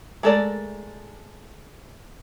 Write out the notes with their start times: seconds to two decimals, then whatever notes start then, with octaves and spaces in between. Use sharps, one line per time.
0.23 G#3 A3 A4 A#4 D5